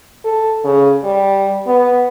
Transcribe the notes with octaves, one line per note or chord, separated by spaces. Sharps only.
A4
C#3
G3
B3